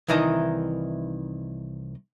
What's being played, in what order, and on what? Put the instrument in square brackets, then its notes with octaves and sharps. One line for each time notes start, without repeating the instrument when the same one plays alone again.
[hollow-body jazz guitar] C2 D#3 E3 D#4 D#5 A5